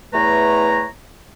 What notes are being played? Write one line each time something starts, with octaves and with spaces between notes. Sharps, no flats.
E2 E3 A3 B4 C#5 A#5